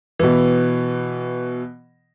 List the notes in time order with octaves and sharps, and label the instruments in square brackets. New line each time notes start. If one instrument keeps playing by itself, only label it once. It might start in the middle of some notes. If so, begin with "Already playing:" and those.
[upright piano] B2 E3